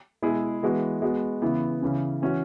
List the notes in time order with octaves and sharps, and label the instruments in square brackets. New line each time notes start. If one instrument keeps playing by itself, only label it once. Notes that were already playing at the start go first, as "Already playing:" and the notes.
[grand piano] B2 G#3 E4 G#4
E3 G#3 B3 F#4
G#3 B3 F#4
C#3 E3 B3 E4
C#3 E3 C#4
E3 C#4 F#4